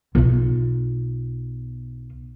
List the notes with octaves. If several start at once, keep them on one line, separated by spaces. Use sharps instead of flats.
B1 F4